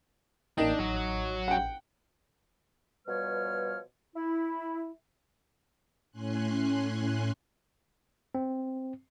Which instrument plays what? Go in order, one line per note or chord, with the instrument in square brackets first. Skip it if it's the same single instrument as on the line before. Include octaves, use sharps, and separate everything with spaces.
[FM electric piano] A1 A#3 G5 [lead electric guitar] D4 [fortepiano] D#4
[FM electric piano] A1 [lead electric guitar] F#3 F#4
[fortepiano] F#5 G5
[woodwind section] B2 F3 G3 B4 C#5 F6
E4
[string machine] A2 C#4 G#5 C6 F#6
[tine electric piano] C4